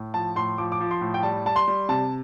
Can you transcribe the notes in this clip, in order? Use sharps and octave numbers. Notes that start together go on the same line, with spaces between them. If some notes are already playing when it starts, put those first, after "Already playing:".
Already playing: A2
F3 A5
A2 C6
F3 D6
D6
F3
C6
A2
G5
G3 A5
G3 A5
C6
G3
C3 A5